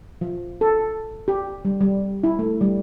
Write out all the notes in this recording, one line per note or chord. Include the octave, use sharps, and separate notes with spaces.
F3
A4
G4
G3
G3
E4
A3
G3